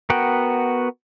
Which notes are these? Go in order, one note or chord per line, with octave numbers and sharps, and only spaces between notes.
B3 F#4 A#4 F#5 G5